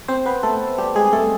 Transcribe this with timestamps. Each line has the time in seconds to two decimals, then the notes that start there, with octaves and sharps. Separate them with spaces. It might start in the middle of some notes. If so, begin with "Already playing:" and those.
0.08 C4 C5
0.26 B3 B4
0.43 A3 A4
0.78 G3 G4
0.95 G#3 G#4
1.13 A3 A4